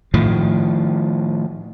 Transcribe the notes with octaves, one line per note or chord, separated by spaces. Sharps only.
A2 D#3 F3